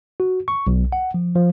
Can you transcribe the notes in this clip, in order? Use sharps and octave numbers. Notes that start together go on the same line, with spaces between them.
F#4
C#6
B1
F#5
F3
F3